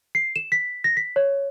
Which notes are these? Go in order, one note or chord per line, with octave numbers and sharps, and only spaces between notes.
C7
E7
B6
A#6
B6
C#5